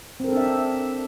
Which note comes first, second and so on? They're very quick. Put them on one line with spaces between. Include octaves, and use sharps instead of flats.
C4 A#4 A4 D4 E5